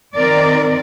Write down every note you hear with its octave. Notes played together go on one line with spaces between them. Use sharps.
D#3 C4 A#4 D5